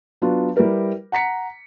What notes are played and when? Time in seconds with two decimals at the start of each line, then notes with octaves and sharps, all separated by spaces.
0.22 F#3 B3 D4 F4 F#4
0.56 G3 E4 G4 A#4 B4
1.12 F#5 A#5 B6 C#7